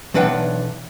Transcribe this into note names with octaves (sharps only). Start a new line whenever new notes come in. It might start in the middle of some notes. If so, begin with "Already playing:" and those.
B1 E3 D4 B4 F#5 G5